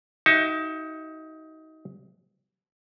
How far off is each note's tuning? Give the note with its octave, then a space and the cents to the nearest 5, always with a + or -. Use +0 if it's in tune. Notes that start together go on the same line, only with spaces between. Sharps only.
D#4 +25 F#4 +35 E5 +10